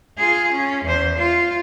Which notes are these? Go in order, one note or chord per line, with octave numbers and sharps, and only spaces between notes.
F4 G#4
C#4
E2 C5
F4